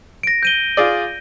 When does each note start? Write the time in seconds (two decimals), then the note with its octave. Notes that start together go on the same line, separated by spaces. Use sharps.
0.23 A#6 D7
0.43 G6 D#7 G7
0.77 F4 G#4 D5